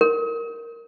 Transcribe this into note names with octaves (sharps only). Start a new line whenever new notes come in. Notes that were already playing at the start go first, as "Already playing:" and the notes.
A#4